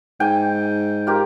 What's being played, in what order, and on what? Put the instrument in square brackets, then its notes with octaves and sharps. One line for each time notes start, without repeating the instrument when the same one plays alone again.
[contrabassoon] G#2 [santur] G5 G#5
[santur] F4 G4 A#4